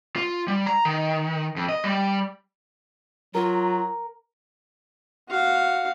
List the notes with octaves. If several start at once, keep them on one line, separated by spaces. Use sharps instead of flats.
F4
G3
A#5
D#3
F2
D#5
G3
F#3 F4 A#4
F#4 F5